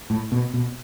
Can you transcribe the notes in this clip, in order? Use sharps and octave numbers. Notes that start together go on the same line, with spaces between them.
A2
B2
B2